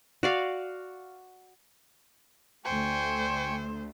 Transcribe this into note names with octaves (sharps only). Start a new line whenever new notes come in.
F#4 D5 F5
D2 A3 C5 G5 G#5 C#6